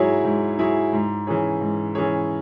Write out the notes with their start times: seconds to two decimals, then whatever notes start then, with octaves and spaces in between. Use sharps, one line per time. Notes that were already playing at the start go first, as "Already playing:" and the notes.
Already playing: G#2 F#3 E4 G#4 C#5
0.24 G#2
0.58 F#3 E4 G#4 C#5
0.93 G#2
1.27 E3 C#4 G#4 C#5
1.61 G#2
1.95 E3 C#4 G#4 C#5